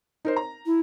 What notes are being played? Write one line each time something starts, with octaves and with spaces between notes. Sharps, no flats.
D#4 A#4 C5
A#5
E4